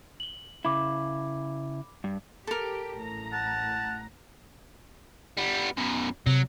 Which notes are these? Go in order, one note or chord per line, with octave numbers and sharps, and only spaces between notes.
F#7 G7
C#3 E4 B5 D6
G2
G4 A4 A#4
A1 A2 A#5
F#5 A5
G3 B3
F#2 B2
C3 F#3